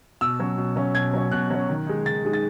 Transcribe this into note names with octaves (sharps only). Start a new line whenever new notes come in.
B2 E6
F#3 C#4
B2
F#3 C#4
B2 G#6
F#3 C#4
B2 F#6
F#3 C#4
D#3
G#3 D#4
D#3 A6
G#3 D#4
A6